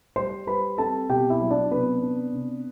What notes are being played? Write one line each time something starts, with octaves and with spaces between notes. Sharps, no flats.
G3 C5 C6
G3 B4 B5
C4 A4 A5
B2 G4 G5
E4 E5
F#3
D4 D5
C3 B3 B4
D4
C3